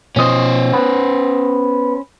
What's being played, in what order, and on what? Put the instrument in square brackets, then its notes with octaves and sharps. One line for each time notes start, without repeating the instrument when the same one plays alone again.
[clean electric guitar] B2 F3 D#5 [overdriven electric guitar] C#4 C5
[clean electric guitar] B3